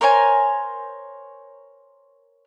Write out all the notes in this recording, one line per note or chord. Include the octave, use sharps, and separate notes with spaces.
A#4 C5 C#5 G#5